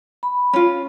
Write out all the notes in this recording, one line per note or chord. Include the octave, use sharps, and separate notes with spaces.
B5
C#4 F4